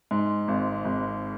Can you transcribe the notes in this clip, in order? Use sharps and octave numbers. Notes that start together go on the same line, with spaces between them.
G#2
G#1
G#1